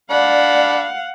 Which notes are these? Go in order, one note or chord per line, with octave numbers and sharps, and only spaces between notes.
D4 D5 F5 F#5 B5